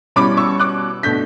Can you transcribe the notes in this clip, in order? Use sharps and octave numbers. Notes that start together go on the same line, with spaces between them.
B2 G3 C#4 E4 B5 D6
C#6 E6
D6 F#6
B2 A3 D4 G6 B6